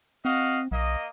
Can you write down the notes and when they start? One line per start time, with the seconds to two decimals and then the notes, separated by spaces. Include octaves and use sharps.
0.25 C4 F#4 D#5 F5
0.71 B1 A#3 D#5